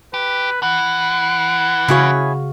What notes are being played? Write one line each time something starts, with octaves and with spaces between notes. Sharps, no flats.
G4 B4
E3 F#5
C#3 E4 F#4 G#4 C#5 F5